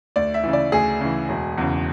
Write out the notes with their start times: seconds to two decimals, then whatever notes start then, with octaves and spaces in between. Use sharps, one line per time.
0.16 D2 D5
0.34 E5
0.44 C#3 E3
0.53 D5
0.72 D2 G#4
1.01 C#3 E3
1.29 E1
1.58 E2 C#3